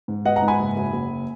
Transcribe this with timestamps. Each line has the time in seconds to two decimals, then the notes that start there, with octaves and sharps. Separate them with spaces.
0.08 G#2
0.25 B3 D#5 F#5
0.36 F#5 A#5
0.42 G#2
0.48 G#5 B5
0.59 F#1
0.77 F#1
0.93 F#1